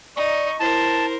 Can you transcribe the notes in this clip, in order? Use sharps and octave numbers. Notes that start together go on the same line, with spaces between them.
D#4 D5 C#6
E4 A#4 C5 A5